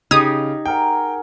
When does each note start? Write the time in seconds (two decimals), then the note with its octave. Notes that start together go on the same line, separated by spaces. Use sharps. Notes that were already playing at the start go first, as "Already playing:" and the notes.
0.11 C#3 D#4 G4 D#6 G#6 F7
0.66 G#4 A#4 F#5 G5